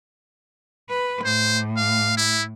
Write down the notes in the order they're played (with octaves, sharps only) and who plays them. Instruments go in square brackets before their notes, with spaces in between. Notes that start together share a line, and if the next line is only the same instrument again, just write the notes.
[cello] B4
[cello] A2 [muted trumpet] C5
[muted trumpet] F5
E4